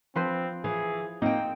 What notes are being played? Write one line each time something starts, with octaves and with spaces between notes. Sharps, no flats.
F3 C4 B4 C5
E3 G#4
A#3 C4 D#4 G5